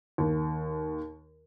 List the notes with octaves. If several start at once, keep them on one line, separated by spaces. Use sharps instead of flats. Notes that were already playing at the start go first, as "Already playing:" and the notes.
D#2